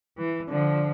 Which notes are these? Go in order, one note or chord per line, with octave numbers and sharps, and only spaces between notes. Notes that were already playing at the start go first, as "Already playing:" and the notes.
E3
D3 F3